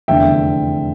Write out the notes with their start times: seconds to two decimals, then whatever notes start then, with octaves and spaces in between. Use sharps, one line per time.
0.08 F1 E2 D3 E5 G5